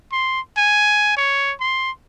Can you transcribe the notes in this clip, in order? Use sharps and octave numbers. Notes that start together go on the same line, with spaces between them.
C6
G#5
C#5
C6